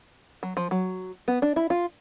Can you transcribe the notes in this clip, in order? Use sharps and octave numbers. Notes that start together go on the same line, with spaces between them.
F#3
F3
F#3
B3
D4
E4
F4